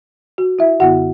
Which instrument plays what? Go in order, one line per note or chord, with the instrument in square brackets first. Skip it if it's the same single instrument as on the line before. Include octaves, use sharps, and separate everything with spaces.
[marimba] F#4
E4 E5
F#2 D3 B3 E4 F#4 F#5